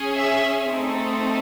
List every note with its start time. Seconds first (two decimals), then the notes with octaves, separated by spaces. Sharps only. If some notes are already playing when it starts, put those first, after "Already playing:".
Already playing: C#4 G#4
0.16 E5
0.72 A3 C4 D#4 A4